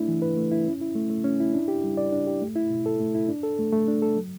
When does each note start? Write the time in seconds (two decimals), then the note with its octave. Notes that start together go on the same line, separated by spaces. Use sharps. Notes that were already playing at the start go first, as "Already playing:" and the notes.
Already playing: A3 D4 E4
0.08 E3
0.22 B4
0.37 A3
0.51 E4
0.67 C#4
0.81 E4
0.95 A3
1.10 A3
1.24 C#4
1.40 E4
1.54 D4
1.68 G4
1.83 G3
1.97 D5
2.12 D4
2.27 G4
2.42 A3
2.56 E4
2.70 B2
2.86 A4
3.00 A3
3.15 E4
3.29 D4
3.43 A4
3.59 A3
3.72 A3
3.88 D4
4.02 A4
4.17 F#3